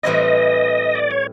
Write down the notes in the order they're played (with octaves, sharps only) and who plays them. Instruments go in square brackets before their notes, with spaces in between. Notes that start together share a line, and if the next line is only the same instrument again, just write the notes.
[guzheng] A2 E3 G3 C4 E4 [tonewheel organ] D#5
[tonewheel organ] D5
C#5